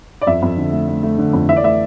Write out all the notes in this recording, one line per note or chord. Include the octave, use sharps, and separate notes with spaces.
D5
F2 E5
F2
D3
A3
A3
A3
D3
F2
E3 E5
D5
A3 E5